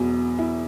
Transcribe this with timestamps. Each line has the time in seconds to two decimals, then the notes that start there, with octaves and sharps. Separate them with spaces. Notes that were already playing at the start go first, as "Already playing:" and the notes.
Already playing: E1 E2 B2 F#3
0.39 E4